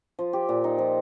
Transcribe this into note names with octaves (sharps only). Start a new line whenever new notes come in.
F3
G4
A#2
D#4
F3